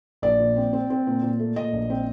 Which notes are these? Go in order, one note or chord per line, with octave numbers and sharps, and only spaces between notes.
A#1 D5
A#2
C4
C4
C4
A#2
A#2
A3
A#2 D#5
A#1
C4